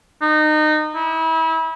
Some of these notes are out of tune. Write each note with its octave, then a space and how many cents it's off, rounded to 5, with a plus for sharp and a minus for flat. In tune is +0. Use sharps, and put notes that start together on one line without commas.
D#4 -25
E4 -35